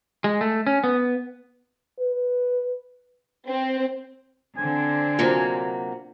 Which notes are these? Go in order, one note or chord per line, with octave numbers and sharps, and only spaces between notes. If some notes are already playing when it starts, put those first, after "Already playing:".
G#3
A3
C#4
B3
B4
C4
D3 C4 G#5
C3 F#3 A#3 F4 C5